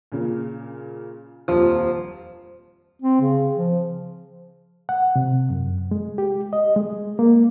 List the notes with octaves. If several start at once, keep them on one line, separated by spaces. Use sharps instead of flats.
A#2 C#3
D#1 F2 F3 F4
C4
C#3
F3
F#5
C3
F#2
G#3
G4
D#5
G#3
A#3